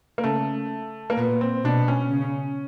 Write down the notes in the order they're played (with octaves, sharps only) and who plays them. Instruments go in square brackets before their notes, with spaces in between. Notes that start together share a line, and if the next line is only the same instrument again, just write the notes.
[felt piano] A#3
[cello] C#3 [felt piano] A3
[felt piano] A#3
[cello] A#2 [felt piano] B3
[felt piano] C4
[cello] B2 [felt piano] D4
[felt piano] C#4
[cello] C#3